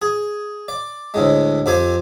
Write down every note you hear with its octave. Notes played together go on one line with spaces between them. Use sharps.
G#4
D5
D2 A2 G#3
F2 C4 G4 C5 G#5